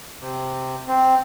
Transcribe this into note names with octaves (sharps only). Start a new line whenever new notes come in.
C3
C4